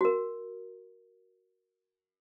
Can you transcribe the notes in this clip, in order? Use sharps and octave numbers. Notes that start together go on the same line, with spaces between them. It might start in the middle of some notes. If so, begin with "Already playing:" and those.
F#4 A#4